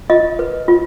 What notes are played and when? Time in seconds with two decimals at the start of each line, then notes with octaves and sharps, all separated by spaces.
0.10 F4 D#5
0.39 B4
0.68 F4